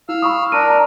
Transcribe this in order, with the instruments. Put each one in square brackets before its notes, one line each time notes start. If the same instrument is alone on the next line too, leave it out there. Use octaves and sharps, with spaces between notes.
[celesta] E4 [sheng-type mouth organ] F5 E6 F6
[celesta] B5 C#6 D#6
[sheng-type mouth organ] D4 A#4 [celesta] D#7
[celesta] A#5